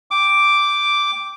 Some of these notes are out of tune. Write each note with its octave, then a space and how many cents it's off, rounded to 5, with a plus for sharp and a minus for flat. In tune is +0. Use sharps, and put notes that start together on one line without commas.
G5 +0 D6 +0